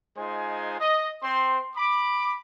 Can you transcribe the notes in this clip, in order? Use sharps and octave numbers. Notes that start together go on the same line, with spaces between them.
G#3 D#4 F4 C5 G#5
D#5
C4 C5 C6
B5 D6